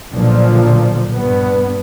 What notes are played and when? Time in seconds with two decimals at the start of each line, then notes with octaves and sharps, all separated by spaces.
0.13 B1 A#2 D3 F3
1.12 G2 B3